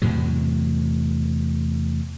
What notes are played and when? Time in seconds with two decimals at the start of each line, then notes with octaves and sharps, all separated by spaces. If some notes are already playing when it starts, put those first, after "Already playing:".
0.02 E2 A2 C3 F#3